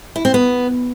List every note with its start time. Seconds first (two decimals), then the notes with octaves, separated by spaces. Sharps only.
0.16 E4
0.25 C4
0.34 B3